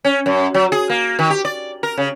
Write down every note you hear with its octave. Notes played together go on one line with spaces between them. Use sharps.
C#4
F#2
F#3
G#4
A#3
D#3
G4
D5
A#4
C#3